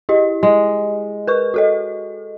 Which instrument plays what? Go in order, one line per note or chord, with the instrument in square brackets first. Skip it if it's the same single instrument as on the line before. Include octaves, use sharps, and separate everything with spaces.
[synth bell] E4 G4 D#5
[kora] G#3
[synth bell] A#4 B4 C#6
F#4 A4 D#5